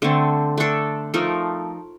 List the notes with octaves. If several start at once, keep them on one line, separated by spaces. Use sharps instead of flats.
D3 A3 C4
A3 D4 A4
F3 A3 D#4 A#4